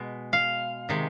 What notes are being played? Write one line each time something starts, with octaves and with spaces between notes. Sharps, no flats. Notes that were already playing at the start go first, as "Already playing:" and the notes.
Already playing: B2 G#3
F5
C3 D#3 G#3